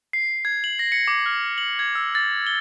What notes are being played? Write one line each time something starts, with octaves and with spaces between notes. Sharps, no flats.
C7
G#6
F#7
A#6
C#7
D6
F6
F#7
G#6
E6
A6
G7